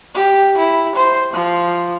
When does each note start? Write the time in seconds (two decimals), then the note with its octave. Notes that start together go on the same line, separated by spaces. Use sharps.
0.14 G4
0.58 E4
0.95 C5
1.33 F3